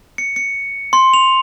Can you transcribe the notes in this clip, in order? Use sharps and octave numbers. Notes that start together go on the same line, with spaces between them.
C#7
C#7
C6
F7